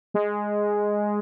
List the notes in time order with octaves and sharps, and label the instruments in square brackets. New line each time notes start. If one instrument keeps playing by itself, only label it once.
[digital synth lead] G#3